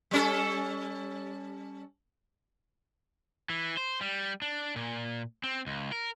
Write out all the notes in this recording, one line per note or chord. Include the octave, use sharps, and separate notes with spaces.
G3 C#4 A4
E3
C5
G3
D4
A#2
C4
C#2
A#4